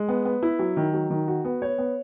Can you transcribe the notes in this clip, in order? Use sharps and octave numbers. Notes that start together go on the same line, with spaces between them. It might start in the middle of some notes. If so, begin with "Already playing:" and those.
Already playing: G#3
B3
B3
E4
F#3
D#3
F#3
D#3
F#4
B3
C#5
B3